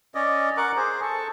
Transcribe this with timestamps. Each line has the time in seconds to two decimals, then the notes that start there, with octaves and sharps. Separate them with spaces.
0.15 C#4 D5 D#5
0.57 A#4 F#5 C#6 D6
0.76 G#4 C5
1.02 A4 C#6